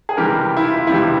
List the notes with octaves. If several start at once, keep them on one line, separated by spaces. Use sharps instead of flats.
G#4
C#2 C3 E3 G3 G4 A#4
E4
F4
C#2 C3 E3 G3 E4